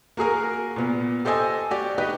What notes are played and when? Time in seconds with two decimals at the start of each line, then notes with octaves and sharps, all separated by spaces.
0.17 A#3 F#4 G#4 A#4
0.76 A#2 B3
1.25 G4 A4 C5 D#5 G#5 E6
1.71 F#4 G4 D5
1.98 D#4 F#4 G4 B4